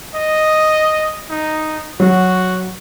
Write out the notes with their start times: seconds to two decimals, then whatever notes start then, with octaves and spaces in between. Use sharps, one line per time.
0.15 D#5
1.30 D#4
2.00 F#3 F#4